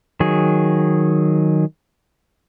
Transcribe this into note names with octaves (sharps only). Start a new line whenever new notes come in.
D#3 F#3 G#4